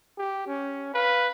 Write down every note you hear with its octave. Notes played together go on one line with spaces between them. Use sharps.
G4
C#4
B4 F5